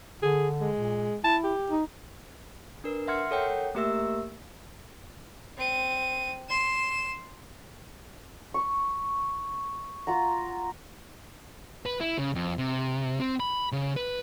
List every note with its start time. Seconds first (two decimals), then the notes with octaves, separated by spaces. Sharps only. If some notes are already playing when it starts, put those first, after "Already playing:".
0.22 D3 G#4
0.60 G#3
0.77 A#2
1.24 E4 A5
1.44 G4
1.70 D#4
2.84 D4 A#4 B4
3.08 E5 F#5 C6 F6 G#6 C#7
3.31 A4 A#4 C#5 F#5 G5
3.75 A3 A#3 G4 A#4 E5 E6
5.57 C4 D#7
6.49 C6 E7
8.54 C#6
10.07 F4 F#5 A#5
11.86 B4
12.00 E4
12.19 C#3
12.35 F2
12.58 C3
13.19 C4
13.40 B5
13.72 C#3
13.96 B4